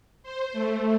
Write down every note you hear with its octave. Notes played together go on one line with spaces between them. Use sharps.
C5
A3